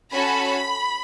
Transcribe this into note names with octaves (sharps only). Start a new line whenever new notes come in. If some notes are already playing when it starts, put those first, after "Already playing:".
C#4 F#4 A4 B5